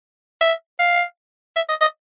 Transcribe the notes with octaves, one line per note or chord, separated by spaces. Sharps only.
E5
F5
E5
D#5
D#5